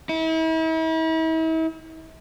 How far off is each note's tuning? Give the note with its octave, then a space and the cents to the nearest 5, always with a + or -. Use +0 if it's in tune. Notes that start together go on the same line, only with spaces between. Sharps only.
E4 -40